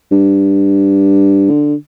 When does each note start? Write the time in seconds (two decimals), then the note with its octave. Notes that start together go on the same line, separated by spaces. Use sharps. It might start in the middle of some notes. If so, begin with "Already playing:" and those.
0.12 G2
1.50 D3